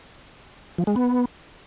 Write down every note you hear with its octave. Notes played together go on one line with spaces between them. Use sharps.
F3
G#3
B3